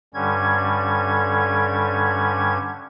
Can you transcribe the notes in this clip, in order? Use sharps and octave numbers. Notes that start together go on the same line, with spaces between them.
G2 D3 G3 C#4 G#6